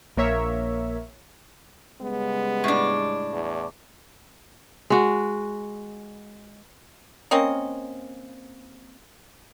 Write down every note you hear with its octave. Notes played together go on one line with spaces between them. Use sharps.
A#1 A#3 A#4 C#5 E5
C#3 G3 G#3 B3
A2 D4
E2
G#3 F#4
A#3 C4 C#4 D#5